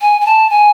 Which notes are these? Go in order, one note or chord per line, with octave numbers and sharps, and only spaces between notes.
G#5
G#5
A5
G#5